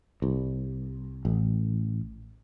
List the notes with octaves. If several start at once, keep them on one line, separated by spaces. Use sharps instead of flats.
C2
A1